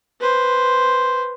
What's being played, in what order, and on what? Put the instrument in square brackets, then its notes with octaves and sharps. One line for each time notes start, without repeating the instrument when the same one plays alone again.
[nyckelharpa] B4 C5